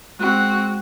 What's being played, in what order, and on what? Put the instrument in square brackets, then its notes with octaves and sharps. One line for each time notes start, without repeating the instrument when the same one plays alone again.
[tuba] G#3 [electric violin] C4 F#4 [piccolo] F#6